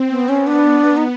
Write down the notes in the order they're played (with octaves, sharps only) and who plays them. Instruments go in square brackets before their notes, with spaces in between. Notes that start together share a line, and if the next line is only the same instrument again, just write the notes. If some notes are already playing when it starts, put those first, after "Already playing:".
Already playing: [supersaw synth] C4
[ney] B3
[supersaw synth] B3 [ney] C#4
[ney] D4
D#4